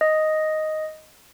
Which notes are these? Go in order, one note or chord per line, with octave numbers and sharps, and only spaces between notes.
D#5